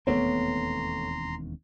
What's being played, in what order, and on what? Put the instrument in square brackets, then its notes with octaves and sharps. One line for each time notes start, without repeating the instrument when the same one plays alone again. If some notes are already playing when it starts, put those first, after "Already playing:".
[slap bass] E1 D#2 C4 [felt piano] A3 B3 C#5 [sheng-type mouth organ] A#5 C6